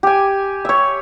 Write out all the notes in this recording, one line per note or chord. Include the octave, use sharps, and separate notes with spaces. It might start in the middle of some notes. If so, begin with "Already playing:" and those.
G4 G#5
C#5 E5